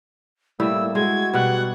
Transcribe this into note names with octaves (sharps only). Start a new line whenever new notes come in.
A2 G3 A#3 E4 E6
G#3 F#4 G#6
B2 G3 F#5